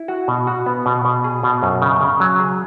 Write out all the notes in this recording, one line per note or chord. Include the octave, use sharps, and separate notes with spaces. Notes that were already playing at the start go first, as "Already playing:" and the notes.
Already playing: E4
F#4
B2
F#4
B3
B2
B2
G#4
B2
F#2
C#3
C#3
F#3
G#4